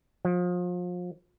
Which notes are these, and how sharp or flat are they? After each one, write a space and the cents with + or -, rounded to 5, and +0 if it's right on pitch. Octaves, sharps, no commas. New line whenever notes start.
F3 +30